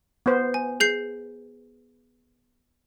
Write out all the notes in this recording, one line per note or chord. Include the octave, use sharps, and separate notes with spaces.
B3 C5
G#5
G#4 G6 C7